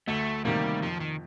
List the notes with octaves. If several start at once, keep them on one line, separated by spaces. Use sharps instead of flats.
D2 A3
C3 D#3 G3 A#3
F2 F3
D#3